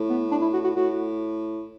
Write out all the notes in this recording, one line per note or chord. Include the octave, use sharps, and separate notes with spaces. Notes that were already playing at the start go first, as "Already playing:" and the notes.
Already playing: A2
B3
D4
E4
F#4
F#4
A2 F#4